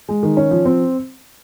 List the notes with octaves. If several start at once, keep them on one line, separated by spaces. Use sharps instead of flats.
G#3
D#3
C#4
F3
C4